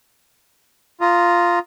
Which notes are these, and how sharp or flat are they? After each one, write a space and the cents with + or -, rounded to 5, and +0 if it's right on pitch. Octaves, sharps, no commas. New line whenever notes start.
F4 -5 A#5 +0 D#6 +0